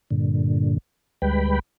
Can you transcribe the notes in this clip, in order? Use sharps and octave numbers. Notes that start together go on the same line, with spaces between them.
G2 A#2 D3
D2 G3 G#3 B4 G5 B5